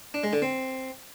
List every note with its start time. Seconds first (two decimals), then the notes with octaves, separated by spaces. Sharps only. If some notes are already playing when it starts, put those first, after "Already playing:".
0.14 D4
0.23 G#3
0.33 D3
0.42 C4